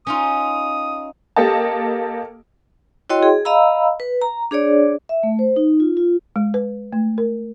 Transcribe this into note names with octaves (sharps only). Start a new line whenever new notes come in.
C#4 D#4 F4 D#6
A#3 G4 A4 D#5 A5
E4 F#4 C#5 D#5 G5 C6
G#4
D#5 F5 A#5 B5 E6
B4
A#5
D4 G#4 C#5 D5
E5
A3
C5
D#4
F4
F4
G#3
B4
A3
A#4